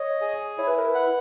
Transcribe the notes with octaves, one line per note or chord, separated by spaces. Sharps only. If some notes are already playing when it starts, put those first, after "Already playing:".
Already playing: C#5 D#5
G#4
E4 C#5
B4
A#4
B4
F#5